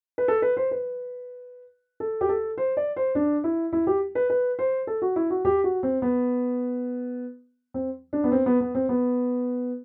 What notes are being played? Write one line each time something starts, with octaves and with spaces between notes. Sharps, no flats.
B4
A4
B4
C5
B4
A4
G4
A4
C5
D5
C5
D4
E4
E4
G4
B4
B4
C5
A4
F#4
E4
F#4
G4
F#4
C4
B3
C4
D4
B3
C4
B3
B3
C4
B3